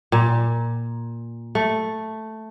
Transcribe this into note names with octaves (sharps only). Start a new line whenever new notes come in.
A#2
A3